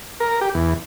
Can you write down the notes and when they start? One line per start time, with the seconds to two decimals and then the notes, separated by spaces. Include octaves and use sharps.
0.20 A#4
0.41 G4
0.55 E2